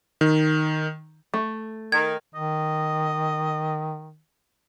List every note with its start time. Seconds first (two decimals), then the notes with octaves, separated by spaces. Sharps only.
0.21 D#3
1.34 A3
1.92 D#3 G#6
2.35 D#3 D#5